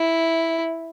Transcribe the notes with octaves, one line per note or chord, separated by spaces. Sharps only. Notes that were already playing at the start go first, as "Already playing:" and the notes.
Already playing: E4